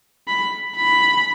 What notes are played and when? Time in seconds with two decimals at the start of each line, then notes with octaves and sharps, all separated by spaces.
0.28 B5
0.77 B5